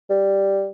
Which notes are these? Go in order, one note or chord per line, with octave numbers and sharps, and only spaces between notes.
G3